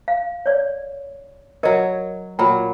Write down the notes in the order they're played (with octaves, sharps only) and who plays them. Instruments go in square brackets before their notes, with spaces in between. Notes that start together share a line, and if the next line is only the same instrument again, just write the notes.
[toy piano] F5
C#5 D5
[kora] F#3 C#5 [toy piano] A#4 D#5
[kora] A#2 F#3 [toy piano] G5 B5